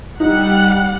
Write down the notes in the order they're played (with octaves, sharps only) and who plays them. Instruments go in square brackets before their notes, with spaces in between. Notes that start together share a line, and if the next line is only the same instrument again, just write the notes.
[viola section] G3 F#5 [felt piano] D#4